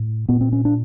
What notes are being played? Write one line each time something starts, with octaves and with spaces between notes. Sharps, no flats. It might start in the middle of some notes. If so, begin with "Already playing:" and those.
Already playing: A2
A#2 B3
C4
C#4
D4